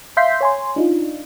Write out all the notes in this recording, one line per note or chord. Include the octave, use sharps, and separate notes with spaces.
E5 F5 C6 G6 B6 C7
C#5 G#5 C6
D4 D#4 F4